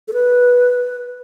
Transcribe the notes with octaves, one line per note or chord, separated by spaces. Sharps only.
A4
B4